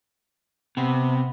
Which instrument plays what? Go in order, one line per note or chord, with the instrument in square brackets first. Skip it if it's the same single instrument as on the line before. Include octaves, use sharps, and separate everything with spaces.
[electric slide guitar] C3 [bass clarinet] B3